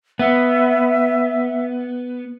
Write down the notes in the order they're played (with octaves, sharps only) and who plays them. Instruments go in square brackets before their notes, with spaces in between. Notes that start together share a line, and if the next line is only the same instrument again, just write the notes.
[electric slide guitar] B3 [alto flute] E5